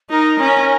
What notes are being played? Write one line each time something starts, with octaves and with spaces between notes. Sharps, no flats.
D#4 A#4
C#4